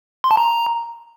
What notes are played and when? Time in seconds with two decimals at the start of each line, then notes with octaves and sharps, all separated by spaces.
0.24 C6
0.31 A5
0.37 A#5